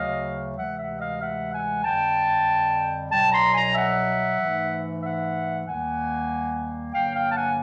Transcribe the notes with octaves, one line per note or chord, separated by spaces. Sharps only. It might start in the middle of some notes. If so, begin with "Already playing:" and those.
Already playing: D2 C#3 F#3 A3 D#5 F5
D2 C3 E3 G#3 E5 F#5
E5 F#5
D#5 F5
E5 F#5
F#5 G#5
F2 D3 G3 G5 A5
C2 B2 F#3 G5 A5
A#5 C6
G#5 A#5
E5 F#5
G#2 E3 A3
E5 F#5
D#2 D#3 G3 A#3 F#5 G#5
G2 D3 F#3 A#3 F5 G5
F5 G5
A5
F#5 G#5